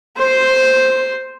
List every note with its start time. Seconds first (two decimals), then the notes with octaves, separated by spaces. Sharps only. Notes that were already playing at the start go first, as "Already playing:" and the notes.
0.18 C5 C6